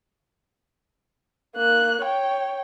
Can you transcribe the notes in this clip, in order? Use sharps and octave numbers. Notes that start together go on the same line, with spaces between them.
A#3 F#6
C#5 G5